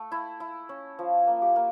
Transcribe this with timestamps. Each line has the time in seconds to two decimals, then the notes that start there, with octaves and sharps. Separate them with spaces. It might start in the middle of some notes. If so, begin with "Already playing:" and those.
Already playing: A3
0.12 E4
0.40 E4
0.69 C#4
0.99 F3
1.27 A#3
1.42 G4
1.56 A#3